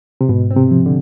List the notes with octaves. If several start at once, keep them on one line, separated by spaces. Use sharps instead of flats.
C3
G#2 B2
C4
C3
F3
D3